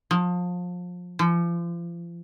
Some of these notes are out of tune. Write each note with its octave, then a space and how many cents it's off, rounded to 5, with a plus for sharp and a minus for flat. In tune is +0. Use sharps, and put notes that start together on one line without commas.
F3 +30
F3 -35